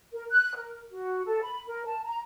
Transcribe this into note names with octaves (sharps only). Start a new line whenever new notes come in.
A#4
F#6
A#4
F#4
A4
B5
A#4
A5
A#5